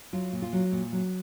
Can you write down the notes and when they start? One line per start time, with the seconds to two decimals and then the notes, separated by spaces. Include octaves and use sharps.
0.13 F#3 F4
0.33 A#2
0.42 F4
0.53 F#3
0.72 A#2
0.92 F#3